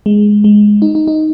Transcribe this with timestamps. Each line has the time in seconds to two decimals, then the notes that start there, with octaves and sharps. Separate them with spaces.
0.06 G#3
0.44 G#3
0.82 D#4
0.95 D#4
1.08 D#4